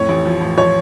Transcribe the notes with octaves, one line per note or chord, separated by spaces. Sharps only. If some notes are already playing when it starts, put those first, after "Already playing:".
Already playing: F2 A2 C#5
A1
F3
A1
F3 C#5